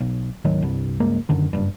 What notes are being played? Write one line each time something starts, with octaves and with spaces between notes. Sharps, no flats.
B1
G#1 D2 D#3 F#3
C2 G2
C#2 G2 G#3 A#3
F#2 D3 D#3
F#1 G2